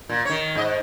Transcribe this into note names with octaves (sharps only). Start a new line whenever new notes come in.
A#2
D#3 C#5
G#2 D#5